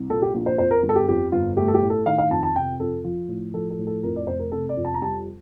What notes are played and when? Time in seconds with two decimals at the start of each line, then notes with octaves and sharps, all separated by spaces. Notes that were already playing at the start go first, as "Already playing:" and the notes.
Already playing: C2
0.10 A#2 A4
0.22 G4
0.34 A#1
0.46 C5
0.58 F2 C5
0.71 A#4
0.83 G1
0.89 A4
0.95 G4
1.08 F2 G4
1.32 G1 F4
1.57 A3 G4
1.68 A4
1.74 G4
1.82 A2
1.90 A4
2.06 D#3 F5
2.18 F5
2.30 F2 A5
2.43 A5
2.56 C3 G5
2.80 F2 A4
3.04 F3 F4
3.29 A2
3.53 F3 A4
3.70 A4
3.79 A2
3.87 A4
4.03 F2 A#4
4.16 D5
4.27 F1 C5
4.39 A#4
4.52 C3 A4
4.69 D5
4.77 F2
4.84 A5
4.94 A#5
5.02 G3 A5